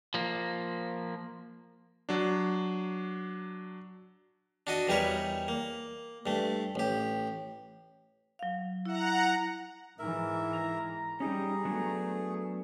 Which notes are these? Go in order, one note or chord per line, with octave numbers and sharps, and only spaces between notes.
F3 A#3
F#3 D4
D4 F#4 D#5
E2 G3 D#4 A#4 B4 C#5
A#3
G2 A3
A1 G4
F#3 F5
E4 E5 F#5 A#5
G#2 E3 A#4 E5
A#5
G3 C#4 D#4 G4 G#4
F#3 A3 B3 D4